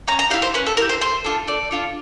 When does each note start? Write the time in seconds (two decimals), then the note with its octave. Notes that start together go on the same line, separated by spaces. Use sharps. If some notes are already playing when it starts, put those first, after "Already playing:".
0.08 C#4 A#5
0.19 A#5
0.30 G4 F5
0.34 E4
0.42 C5
0.54 C#4 B4
0.66 A4
0.77 E4 G4 A#4
0.89 C5
1.01 A3 C5
1.24 D4 F4 A4
1.47 A3 D5
1.71 D4 F4 A4